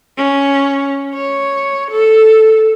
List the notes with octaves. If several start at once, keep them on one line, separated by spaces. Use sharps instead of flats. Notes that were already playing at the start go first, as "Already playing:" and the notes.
C#4
C#5
A4